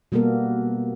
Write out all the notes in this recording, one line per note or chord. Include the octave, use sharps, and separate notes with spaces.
B2 G3 A#3 B3 A4 A#4